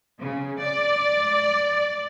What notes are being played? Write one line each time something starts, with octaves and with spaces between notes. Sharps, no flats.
C#3
D5